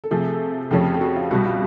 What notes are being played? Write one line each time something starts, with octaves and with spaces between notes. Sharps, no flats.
A4
C3 F3 A3 G#4
F2 C#3 F3 A3 C#4 G4
G4
F#4
F4
C2 B2 G3 F#4
F4